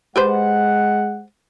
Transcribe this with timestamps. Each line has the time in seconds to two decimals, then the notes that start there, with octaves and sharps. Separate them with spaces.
0.16 G#3 G4 B4 C5 F#5